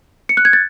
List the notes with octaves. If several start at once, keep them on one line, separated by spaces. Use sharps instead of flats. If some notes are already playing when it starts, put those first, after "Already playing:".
C#7
F#6
G#6
A6